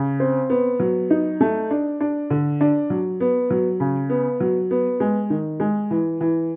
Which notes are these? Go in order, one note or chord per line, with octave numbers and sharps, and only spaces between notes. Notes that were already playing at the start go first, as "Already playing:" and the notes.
Already playing: C#3
C4
B3
F#3
D#4
A3
D4
D4
D3
D4
F#3
B3
F#3
C#3
B3
F#3
B3
G#3
D#3
G#3
E3
E3